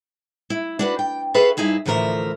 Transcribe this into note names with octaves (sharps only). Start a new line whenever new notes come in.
E4
D4 F#4 B4
G5
G#4 A4 B4 C#5 E5 F5
G2 D#4 E4 G#4 E5
D2 A2 E3 F3 A#4 E5